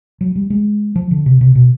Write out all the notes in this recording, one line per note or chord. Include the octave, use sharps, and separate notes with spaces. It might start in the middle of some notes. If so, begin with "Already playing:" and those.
F#3
G3
G#3
F3
D3
C3
C3
B2